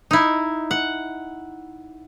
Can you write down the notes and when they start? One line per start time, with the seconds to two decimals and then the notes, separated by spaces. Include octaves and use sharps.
0.11 D#4 E4
0.71 F#5